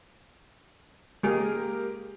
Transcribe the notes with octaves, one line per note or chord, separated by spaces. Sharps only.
G#3 A#3 G4 G#4 A#4